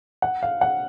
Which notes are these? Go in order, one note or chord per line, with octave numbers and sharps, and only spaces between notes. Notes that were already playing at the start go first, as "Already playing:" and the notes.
F#5
F5
F#5